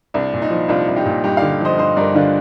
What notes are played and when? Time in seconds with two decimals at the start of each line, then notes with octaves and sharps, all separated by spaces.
0.14 C2 D4
0.34 A#2
0.42 D#4
0.51 F3
0.69 C2 D4 F4
0.88 C2
0.96 D#4 G4
1.06 A#2
1.24 G2 D#4 G4
1.37 D3 D5 F5
1.61 F3 C5 D#5
1.78 G2 C5 D#5
1.97 G2 A#4 D5
2.15 D3 D4 F4